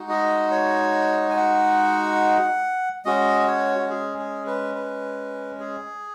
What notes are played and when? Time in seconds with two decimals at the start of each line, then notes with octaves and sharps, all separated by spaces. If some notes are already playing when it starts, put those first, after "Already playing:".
Already playing: G#3 D#4 F#4
0.09 D#5
0.51 C#5
1.30 G#5
1.36 F#5
3.05 G#3 C#4 F#4 D#5
3.47 C#5
3.78 F#4
3.90 G#4
4.18 G#4
4.47 B4
4.75 B4
5.60 G#4